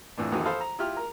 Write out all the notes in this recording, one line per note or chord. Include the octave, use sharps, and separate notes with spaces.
F2 A2 E3 D4
A#1 F2 D#3 E3 C4 F#4
A4 C5 F5 B5 D#6
A#5
E4 F4 G4 F6
A#4 A#5